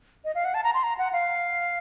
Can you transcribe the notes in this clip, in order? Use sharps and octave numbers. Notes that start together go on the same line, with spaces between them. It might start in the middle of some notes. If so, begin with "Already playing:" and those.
D#5
F5
F#5
A5
A#5
C6
A#5
F#5
F5